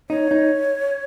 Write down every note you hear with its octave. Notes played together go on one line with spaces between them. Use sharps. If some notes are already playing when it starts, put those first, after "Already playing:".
D#4 C#5
D#4